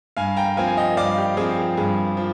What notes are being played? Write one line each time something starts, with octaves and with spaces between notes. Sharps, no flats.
G2 F5 G#5
G5 A#5
F3 C4 F5 G#5
G#5
D#5 G5
G2 D5 F5
G4
F3 C4 G#4
G#4
G2 G#4
F3